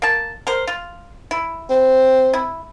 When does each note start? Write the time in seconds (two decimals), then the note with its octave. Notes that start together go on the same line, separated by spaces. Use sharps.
0.02 A#3 A5
0.47 A#4 C5
0.68 F4
1.31 E4
1.70 C4
2.33 E4